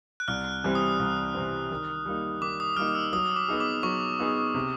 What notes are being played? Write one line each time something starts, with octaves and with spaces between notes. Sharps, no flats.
F#6
C2 F6
C3 E3 G3 C4
D#6
C2
C3 E3 G3 C4
D#3
G3 A#3 D#4
D#3 D6
D#6
G3 A#3 D#4 F6
E6
F#3 D#6
D6
B3 D#4 G#4
D6
F#3 C#6
B3 D#4 G#4
C3